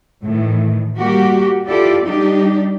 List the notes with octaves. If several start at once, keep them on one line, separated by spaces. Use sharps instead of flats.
A2 D#3 E3
G3 A#3 F#4 G4
E4 F4 G4 A4 D5
G3 D4 D#4 G4